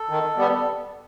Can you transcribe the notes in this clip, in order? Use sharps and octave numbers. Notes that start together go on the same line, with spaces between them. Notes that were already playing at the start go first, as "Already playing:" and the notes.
Already playing: A4
D#3
G3 B3